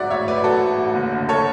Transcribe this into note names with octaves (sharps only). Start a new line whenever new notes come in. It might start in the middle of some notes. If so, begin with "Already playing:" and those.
Already playing: A1 G#2 F#3 D5 E5 F#5
A1 C#5 E5
A1 B4 D5
F#3 F#4 A4
G#2
A1
F#1
D3
A4 C#5